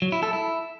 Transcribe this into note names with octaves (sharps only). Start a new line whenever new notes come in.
F#3
E4
A4
E4